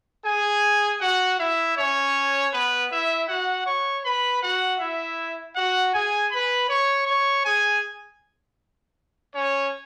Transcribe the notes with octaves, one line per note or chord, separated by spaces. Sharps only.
G#4 G#5
F#4 F#5
E4 E5
C#4 C#5
B3 B4
E4 E5
F#4 F#5
C#5 C#6
B4 B5
F#4 F#5
E4 E5
F#4 F#5
G#4 G#5
B4 B5
C#5 C#6
C#5 C#6
G#4 G#5
C#4 C#5